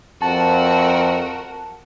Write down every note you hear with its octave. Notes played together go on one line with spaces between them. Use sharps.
F2 F#4 A#4 A5